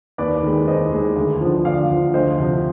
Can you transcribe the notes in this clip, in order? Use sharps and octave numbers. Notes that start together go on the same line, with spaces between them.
D#2 B4 D5
D#3 G#3
D#2 C5 D#5
D#3 G#3
D2
D3 F3
D2 D5 F5
D3 F3
D2 C5 D#5
C3 F3